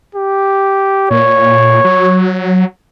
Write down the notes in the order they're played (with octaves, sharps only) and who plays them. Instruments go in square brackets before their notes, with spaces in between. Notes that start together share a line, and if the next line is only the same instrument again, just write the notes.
[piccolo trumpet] G4
[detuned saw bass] A#2 [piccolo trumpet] C#5
[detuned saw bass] F#3